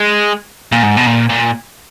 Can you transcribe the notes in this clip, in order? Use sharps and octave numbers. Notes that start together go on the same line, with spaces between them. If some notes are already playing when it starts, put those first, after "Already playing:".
Already playing: G#3
A#2
G#2
B2
A#2
A#2